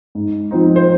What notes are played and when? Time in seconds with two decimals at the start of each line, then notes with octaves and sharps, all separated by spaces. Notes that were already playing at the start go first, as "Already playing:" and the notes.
0.15 G#2
0.51 F3 C4 D#4
0.76 C5